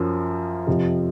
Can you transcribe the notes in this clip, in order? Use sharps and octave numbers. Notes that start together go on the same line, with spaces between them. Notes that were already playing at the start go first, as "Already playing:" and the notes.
Already playing: F#2 F3
F2 C3 F3